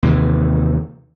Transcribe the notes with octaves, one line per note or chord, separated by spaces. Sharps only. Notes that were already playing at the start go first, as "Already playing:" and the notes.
D#2 C3 E3